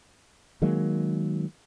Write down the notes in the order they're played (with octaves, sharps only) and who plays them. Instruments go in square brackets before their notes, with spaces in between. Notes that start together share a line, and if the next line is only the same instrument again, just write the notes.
[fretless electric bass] D#3 F#3 G#3 A#3